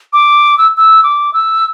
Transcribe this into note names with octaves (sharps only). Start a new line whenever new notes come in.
D6
E6
E6
D6
E6